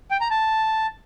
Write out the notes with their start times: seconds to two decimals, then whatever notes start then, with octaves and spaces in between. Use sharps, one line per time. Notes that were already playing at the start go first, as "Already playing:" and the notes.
0.11 G5
0.21 A#5
0.31 A5